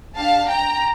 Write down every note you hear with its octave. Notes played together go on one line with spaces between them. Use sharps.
D4 G4 F5 A5
G5 A#5